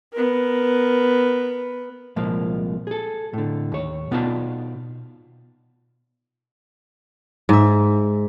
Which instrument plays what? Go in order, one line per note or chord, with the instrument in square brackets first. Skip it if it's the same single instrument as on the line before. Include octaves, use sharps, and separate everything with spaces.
[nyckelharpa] B3 A#4
[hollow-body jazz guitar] C2 A#2 F3 G#3 A#3
G#4 A4
A2 D3
D#2 C#5
B2 B3 D#4 F4 D5 A5
[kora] G#2 E5